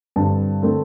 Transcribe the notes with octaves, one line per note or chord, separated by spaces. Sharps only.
G2 D3 G3 C4 A5
D3 A3 C4